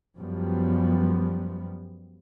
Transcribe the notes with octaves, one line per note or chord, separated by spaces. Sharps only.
F#2 F3 G3 B3